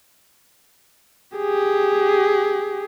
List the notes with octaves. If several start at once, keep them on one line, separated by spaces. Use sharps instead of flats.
G4 G#4